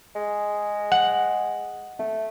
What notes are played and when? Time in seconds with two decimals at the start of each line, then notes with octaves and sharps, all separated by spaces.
0.16 G#3
0.92 F#5
1.99 A3